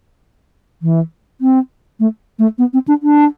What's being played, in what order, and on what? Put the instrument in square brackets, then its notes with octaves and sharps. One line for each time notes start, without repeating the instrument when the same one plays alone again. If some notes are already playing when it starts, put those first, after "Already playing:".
[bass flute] E3
C4
A3
A3
B3
C4
D4
D4